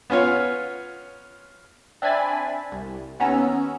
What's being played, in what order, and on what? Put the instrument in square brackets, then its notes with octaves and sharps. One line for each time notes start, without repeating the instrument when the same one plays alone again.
[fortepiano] B3 C#4 F4 C#5
[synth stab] C4 D4 E5 G#5 B5 A6
C2
D#2 B3 C#4 A#5 E6